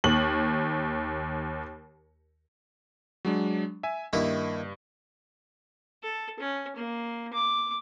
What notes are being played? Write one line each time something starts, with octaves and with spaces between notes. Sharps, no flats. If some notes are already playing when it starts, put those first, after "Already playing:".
D#2 F#7
F#3 G#3 D4
E5 G#5
G2 D#3 A#3 E4
A4
C#4
A#3
D6